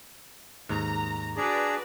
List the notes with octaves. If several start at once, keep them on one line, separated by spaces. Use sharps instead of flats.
D#2 G#2 A#5
D4 F#4 G#4 B4 D5 A#5